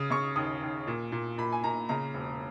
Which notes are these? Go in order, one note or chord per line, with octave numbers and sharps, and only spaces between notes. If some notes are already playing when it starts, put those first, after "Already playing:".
Already playing: C#3 D#6
C#3 C#6
D#2 D#6
D#2
A#2
A#2
A#2 B5
G#5
A#2 A#5
C#3 A#5
E1